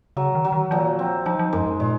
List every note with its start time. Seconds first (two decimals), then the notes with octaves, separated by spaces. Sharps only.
0.17 C#3 F#3
0.35 D#3
0.44 F#3
0.52 D#3
0.71 A#2 F3
0.79 D#3
0.86 F3
0.99 C4
1.26 F3 D#4
1.39 F3
1.53 F#2 G#3
1.66 F#2
1.80 A#2 G#3